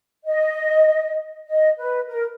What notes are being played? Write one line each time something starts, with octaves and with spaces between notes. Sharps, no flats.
D#5
D#5
B4
A#4